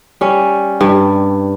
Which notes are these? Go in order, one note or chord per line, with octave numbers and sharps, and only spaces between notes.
G3 C#4
G2